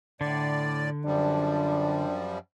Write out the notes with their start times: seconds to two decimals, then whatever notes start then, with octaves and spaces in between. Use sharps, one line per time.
0.21 A2 D3 D5
1.05 F#2 F3 G3 D4